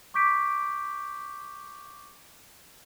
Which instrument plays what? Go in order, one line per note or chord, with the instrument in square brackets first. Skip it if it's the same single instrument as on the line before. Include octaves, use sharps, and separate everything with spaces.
[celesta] C#6 D6 G6 B6 D7